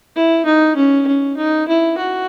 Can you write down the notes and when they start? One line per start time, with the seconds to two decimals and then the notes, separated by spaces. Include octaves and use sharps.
0.16 E4
0.46 D#4
0.76 C#4
1.07 C#4
1.37 D#4
1.68 E4
1.98 F#4